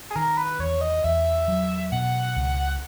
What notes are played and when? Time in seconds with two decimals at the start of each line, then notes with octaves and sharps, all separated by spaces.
0.11 G#4
0.16 D#3 A#4
0.37 B4
0.59 E2 C#5
0.81 D#5
1.04 E2 E5
1.48 F#3
1.92 B2 F#5
2.36 C#2